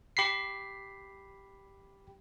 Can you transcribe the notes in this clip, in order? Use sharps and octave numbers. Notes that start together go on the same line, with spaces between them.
G4 B5 B6 C7